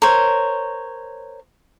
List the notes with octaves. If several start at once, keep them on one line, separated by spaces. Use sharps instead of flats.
A#4 C5 C#5